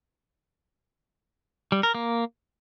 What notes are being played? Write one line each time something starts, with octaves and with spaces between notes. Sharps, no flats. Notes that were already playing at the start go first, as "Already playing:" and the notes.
G3
A#4
A#3